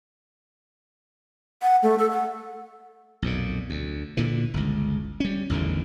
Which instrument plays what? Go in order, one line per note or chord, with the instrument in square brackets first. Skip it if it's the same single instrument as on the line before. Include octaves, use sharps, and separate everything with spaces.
[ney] F#5
A3
A4
F#5
[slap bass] B1 F2 A#2
D2
A#2 D3 E3
G1 C#2
G3 C#4
A1 E2 D3 D#3